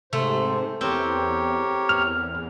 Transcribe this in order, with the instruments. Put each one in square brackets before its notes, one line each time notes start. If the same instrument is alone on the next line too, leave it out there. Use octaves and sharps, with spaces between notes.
[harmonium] G#2 C5 [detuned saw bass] C3 [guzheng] A3
[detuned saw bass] E2 [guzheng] C4 [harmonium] G4 A#4 C#5
[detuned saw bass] E2 [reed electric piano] F6